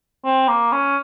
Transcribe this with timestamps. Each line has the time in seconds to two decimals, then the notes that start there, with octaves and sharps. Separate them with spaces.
0.25 C4
0.48 A#3
0.72 C#4